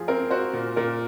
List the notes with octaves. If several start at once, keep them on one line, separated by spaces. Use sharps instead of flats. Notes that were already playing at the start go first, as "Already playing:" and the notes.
Already playing: F3 G#4
C4 A#4
F#4 C5
A#2
A#2 A#4